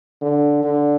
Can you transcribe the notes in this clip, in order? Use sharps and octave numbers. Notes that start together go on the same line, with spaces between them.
D3
D3